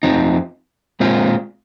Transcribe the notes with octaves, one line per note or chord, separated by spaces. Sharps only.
F2 F3 C4 D#4
A#2 G#3 C4 F4